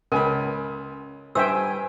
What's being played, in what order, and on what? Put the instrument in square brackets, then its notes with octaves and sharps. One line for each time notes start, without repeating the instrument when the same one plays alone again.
[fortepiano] C#2 G#5 B5 [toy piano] A#4
[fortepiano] G2 [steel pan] C5 E5 G5 [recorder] G#5 [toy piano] E6